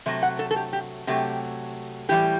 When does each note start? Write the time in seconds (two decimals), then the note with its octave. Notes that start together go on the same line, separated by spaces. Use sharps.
0.06 C3 F#3 A3
0.23 F#5
0.39 A4
0.51 A4
0.56 G4
0.73 G4
1.07 C3 F#3 A3 G4
2.09 A2 E3 G3 G4